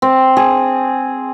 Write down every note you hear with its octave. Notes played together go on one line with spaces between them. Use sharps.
C4
G#4